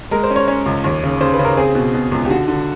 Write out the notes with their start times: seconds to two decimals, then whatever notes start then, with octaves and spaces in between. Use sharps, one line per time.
0.11 G#3 A#4
0.24 C5
0.30 C#4
0.36 C#5
0.48 C#4 C#5
0.66 C#2
0.84 D#2
1.03 C#3
1.20 C#3 C5
1.34 B4
1.39 C#3
1.45 A#4
1.57 C4 G#4
1.75 B2
1.94 B2
2.12 C#2
2.25 G4
2.30 D3 F#4
2.48 D3